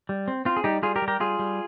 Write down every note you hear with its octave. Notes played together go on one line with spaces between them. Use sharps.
G3
C4
C4 F4
G#4
G3 D#4 G4
G3 F4 G#4
G4 A#4
G3
G4 A#4
G3 F4 G#4
G3